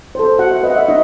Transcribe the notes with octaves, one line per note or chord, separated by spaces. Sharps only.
A4 C5
F#4 F#5
E5
B4 D#5
F#5
E5
D#4 D#5